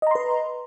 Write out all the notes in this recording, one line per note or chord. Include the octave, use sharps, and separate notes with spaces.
B4 D#5 A#5 C6